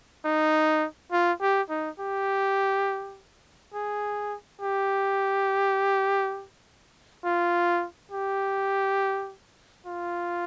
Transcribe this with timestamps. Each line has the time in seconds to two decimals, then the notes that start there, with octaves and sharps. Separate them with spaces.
0.25 D#4
1.12 F4
1.41 G4
1.70 D#4
2.00 G4
3.74 G#4
4.61 G4
7.24 F4
8.11 G4
9.86 F4